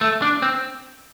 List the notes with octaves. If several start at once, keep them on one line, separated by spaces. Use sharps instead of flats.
A3
D4
C4